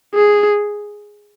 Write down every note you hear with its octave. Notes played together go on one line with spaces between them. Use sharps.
G#4